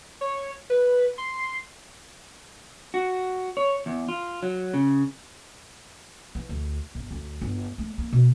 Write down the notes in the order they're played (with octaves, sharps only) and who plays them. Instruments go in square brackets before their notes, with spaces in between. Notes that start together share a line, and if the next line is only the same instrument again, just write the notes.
[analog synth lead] C#5
B4
C6
[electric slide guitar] F#4
C#5
E2
F4
F#3
C#3
[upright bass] E3
D2
G1
D2
G1
A3
A#3
B2